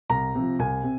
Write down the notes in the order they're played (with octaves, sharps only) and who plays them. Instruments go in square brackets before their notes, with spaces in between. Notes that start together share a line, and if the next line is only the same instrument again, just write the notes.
[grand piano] C2 A#5
C3 F3
C2 G#5
C3